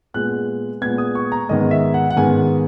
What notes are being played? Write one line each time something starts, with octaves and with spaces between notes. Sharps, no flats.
A#2 G#3 B3 F#6
A#2 G#3 B3 G#6
D#6
C#6
A#5
G#2 D#3 G#3 B3 D#5
E5
F#5
F#5
G#2 D#3 G#3 B3 G#5